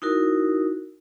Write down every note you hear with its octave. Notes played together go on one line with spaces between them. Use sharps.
D#4 E4 F#4 A#4